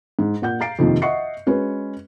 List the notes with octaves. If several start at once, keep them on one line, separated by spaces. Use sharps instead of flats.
G#2
A#2 F#5 G6
F5 A#5 A6 C7 D7
F2 C3 D#3 F3 A#3
D#5 E5 F#5 C#6 C7 C#7
G#3 C#4 F#4 B4